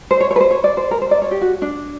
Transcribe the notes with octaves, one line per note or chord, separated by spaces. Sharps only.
C5
C#5
C#5
B4
C5
C#5
D5
C5
A#4
C5
D5
C#5
G4
F#4
D4